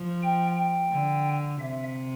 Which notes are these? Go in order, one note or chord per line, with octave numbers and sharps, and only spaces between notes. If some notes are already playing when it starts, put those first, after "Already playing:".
Already playing: F3
G5
G5
D3
C3 E5